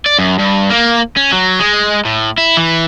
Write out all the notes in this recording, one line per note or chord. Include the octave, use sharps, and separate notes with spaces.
D5
F#2
G2
A#3
C#4
F#3
G#3
A2
E4
E3